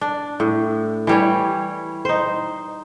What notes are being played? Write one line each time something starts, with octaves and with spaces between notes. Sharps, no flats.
D4
A2
E3 G3 C#5
D#4 C5